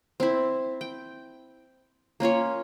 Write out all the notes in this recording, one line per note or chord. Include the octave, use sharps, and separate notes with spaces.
C4 E4
G5
A#3 C#4 F4 C#5